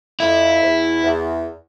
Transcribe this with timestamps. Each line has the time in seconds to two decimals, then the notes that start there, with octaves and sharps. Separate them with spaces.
0.20 F2 E4
0.62 E2
1.03 E2